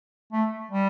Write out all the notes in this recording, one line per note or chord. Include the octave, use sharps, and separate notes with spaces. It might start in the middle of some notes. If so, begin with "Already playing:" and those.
A3
G3